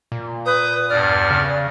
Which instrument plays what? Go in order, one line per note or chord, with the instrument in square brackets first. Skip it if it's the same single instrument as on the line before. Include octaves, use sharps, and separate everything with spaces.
[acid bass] A#2
[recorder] B4 [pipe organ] D#6 G6
[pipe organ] E2 G2 F6 [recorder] D5
[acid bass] C#3